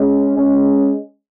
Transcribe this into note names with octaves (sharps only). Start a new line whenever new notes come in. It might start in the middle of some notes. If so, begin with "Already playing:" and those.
Already playing: G#3 C#4
G#3 C#4